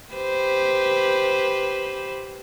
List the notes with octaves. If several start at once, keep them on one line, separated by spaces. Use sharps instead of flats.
G4 B4 C5